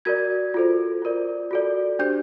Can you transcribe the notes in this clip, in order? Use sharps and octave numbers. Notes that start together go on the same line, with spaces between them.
F#4 A#4 D5 G#6
F4 A4 C5
F4 A#4 D5
F#4 A4 D5
D4 G4 C5 G6